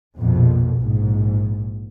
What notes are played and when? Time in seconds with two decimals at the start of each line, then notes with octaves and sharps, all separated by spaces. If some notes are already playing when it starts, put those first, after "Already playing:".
0.18 A#1 F2 B2
0.76 A#1 G#2